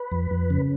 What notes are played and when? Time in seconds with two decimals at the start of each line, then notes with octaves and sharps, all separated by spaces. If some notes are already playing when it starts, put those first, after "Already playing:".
Already playing: B4
0.11 F2
0.31 F2
0.50 C#3